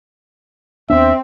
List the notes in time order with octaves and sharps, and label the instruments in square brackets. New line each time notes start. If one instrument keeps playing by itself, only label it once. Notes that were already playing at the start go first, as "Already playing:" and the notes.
[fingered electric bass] D#2 B3 D4 [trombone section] C4 [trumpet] E5